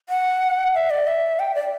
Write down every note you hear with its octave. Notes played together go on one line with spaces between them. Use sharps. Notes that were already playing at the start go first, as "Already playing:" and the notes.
F#5
E5
D5
E5
G5
D5